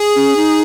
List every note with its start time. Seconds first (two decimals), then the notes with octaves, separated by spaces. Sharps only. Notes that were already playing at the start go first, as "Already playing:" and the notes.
Already playing: G#4
0.16 C#4
0.36 D#4